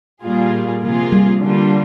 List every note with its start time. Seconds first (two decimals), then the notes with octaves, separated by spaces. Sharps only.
0.23 A#2 G3 A#3 F4 G#4
0.83 C3 F3 A#3 F4 G#4
1.12 G3
1.41 D3 G3 A#3 D4 F4